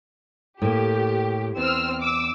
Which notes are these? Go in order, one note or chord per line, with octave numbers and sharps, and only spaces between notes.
A2 A#3 G4
E2 C4 E6 F6
D6 E6